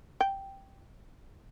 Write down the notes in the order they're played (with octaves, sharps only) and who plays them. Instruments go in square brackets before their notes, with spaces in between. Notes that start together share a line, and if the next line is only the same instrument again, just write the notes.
[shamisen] G5